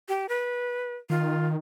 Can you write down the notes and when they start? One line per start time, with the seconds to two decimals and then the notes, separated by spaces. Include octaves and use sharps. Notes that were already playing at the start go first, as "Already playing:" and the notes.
0.09 G4
0.29 B4
1.10 D#3 F4